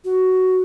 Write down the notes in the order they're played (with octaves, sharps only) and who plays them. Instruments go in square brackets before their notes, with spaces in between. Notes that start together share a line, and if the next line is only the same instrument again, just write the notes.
[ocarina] F#4